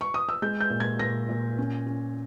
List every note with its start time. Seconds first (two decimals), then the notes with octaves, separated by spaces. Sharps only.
0.01 C#6
0.14 D#6
0.29 E6
0.42 G#3 G6
0.61 G6
0.70 A#2
0.80 G#6
0.99 A#2 A#6
1.29 A#2
1.58 C#4
1.87 C#4